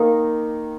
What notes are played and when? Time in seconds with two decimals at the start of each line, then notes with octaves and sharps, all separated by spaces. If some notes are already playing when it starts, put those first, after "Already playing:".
Already playing: D#3 A#3 D#4